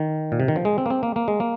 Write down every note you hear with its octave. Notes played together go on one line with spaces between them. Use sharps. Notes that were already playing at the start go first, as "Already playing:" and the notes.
Already playing: D#3
A#2
C3
D#3
F3
G#3
C4
A#3
C4
A#3
A#3
G#3
A#3